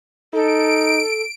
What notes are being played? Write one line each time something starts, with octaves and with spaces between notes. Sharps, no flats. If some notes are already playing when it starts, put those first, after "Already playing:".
D#4 A4 D7